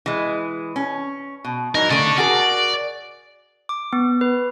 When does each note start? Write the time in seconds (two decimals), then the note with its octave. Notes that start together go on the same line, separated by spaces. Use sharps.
0.06 E3 G#3
0.76 C#4
1.44 B2
1.75 E3 F#3 D#4 A#4
1.90 C#3 A3 A4 D5
2.18 F#4 G#4 A#4 D5
3.69 D6
3.93 B3
4.21 B4